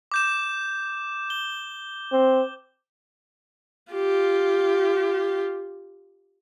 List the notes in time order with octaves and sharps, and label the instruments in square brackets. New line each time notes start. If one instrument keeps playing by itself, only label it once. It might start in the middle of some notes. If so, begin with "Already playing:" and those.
[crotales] D6 G6 E7
G7
[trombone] C4
[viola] F4 G4